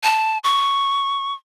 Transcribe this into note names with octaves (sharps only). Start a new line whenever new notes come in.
A5
C#6